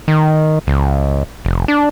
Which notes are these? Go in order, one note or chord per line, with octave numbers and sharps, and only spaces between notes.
D#3
C#2
F1
D4